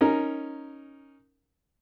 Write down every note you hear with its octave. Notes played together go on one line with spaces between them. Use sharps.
C#4 D#4 A#4